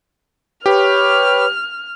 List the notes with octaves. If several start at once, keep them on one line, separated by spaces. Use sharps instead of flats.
G4 B4 C#5 F6